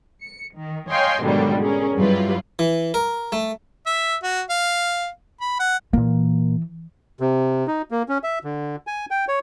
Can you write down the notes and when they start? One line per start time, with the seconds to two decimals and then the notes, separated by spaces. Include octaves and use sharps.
0.21 C#7
0.55 D#3
0.90 C#5 D#5 F5 G5 G#5 C6
1.22 G#2 B2 D3 D#3 F#3 G3
1.60 C#4 G#4 A#4
1.95 G2 F#3 G3 E4 F4 B4
2.59 E3
2.94 A#4
3.32 A3
3.86 E5
4.23 F#4
4.50 F5
5.41 B5
5.59 F#5
5.93 A#2 E3 A#3
7.20 C3
7.67 D#4
7.91 A#3
8.09 C#4
8.23 E5
8.44 D3
8.87 G#5
9.11 G5
9.28 C#5